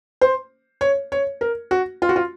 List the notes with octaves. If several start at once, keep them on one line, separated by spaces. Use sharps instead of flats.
C5
C#5
C#5
A#4
F#4
F4
F#4
F4